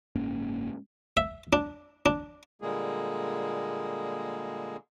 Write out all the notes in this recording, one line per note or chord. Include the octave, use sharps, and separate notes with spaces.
F#1 G#2 A#3 C#4
E5
D4
D4
A#2 D3 G3 G#3 A#3 G#4